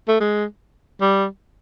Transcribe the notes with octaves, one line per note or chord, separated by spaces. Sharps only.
A3
G#3
G3